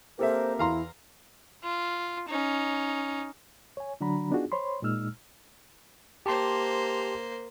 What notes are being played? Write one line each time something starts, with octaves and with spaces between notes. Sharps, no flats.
A#3 C4 G4 A4 A#4 C5 E5
E2 E4 F5 A#5 C6
F4
C#4 D#4
C#5 G#5
D3 F#3 D4 F#4 A#5 B5
B3 D4 D#4 F4 F#4 G#4
C5 C#5 B5 C6
A#2 G#3 D#4 E6 F6
A#3 G4 C5 A5 C6